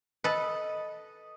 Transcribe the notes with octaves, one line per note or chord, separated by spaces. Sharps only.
A4 B4 D#5